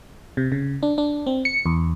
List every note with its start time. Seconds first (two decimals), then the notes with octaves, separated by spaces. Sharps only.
0.37 C3
0.52 C#3
0.83 D4
0.98 D4
1.27 C4
1.45 C#7
1.66 E2